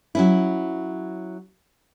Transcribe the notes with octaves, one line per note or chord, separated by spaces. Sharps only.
F#3 C#4 E4